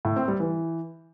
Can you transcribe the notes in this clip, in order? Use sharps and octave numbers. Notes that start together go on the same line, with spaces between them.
A2
C4
G3
E3